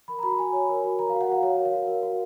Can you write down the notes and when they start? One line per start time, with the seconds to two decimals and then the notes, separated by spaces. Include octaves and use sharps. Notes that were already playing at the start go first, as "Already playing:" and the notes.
0.08 A#4 B5
0.19 A#5
0.23 F#4 B5
0.38 F#4 G#5
0.53 C#5
0.69 A#4
0.84 F#4
0.99 A#4 A#5
1.10 F#4 F5
1.21 F#5
1.28 F#4 F5
1.43 C#5 F5
1.58 A#4
1.65 F5
1.73 F#4
1.87 A#4
2.03 F#4